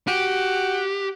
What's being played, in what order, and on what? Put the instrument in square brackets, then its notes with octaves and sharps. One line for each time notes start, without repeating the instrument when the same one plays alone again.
[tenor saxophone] F#4 [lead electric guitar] G4